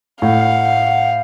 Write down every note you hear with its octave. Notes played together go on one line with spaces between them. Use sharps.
A2 F5 F#5